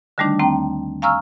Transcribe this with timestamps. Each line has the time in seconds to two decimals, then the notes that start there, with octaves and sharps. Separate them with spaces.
0.18 D3 D#3 G3 A3 D4 D#4
0.39 D#2 A3 C4 G5 A#5
1.02 F5 G#5 A#5 C#6 E6 F6